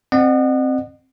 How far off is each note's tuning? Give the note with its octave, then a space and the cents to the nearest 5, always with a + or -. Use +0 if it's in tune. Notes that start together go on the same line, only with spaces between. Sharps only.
C4 +5 D#5 -40 F#5 +0